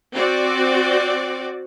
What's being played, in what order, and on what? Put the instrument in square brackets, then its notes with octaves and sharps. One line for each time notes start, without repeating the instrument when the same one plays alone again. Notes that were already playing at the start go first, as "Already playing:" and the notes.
[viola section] C4 F#4 D5